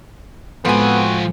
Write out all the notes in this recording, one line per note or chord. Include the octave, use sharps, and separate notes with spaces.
A2 F3 G#3 B3 C4 F#4 G#5